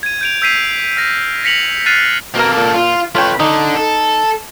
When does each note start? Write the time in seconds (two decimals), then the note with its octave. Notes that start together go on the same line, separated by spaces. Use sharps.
0.03 G#6 D#7
0.21 G6 D7 F7
0.42 E6 G6 B6 C7 D#7 F7
0.97 F6 A#6 B6
1.44 A#6 B6 C#7 F7 F#7
1.86 F6 F#6 A6 C7 D#7 F7
2.35 B2 A#3 A4 A#4
2.57 A#2
2.75 F4
3.15 A3 F4 B4 C#5 G5
3.40 D3 D#4
3.75 A4